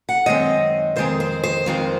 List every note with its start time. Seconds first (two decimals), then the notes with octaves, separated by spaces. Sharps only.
0.09 F#5
0.26 F#2 D#3 G#3 C4 D#5
0.96 F2 D#3 G#3 C4 C5
1.20 C5
1.43 C5
1.66 F2 D#3 G#3 C4